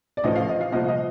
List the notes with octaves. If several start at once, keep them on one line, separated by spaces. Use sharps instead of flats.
D5
A1 A2 F3 D#5
F5
D#5
F5
C2 A#2 F3 D#5
D#5